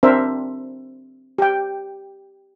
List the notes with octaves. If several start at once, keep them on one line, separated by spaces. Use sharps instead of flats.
C4 D4 A#4 C5 E5
G4 G5